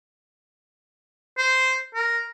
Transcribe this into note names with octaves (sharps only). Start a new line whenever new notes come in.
C5
A#4